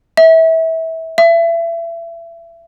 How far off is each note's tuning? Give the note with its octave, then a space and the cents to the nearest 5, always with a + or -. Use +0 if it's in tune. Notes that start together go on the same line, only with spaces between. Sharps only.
E5 -25
E5 +30